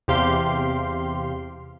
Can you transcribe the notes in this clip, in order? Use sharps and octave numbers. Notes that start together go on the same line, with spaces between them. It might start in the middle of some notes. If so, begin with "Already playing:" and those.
E2 C3 G4 F5 C6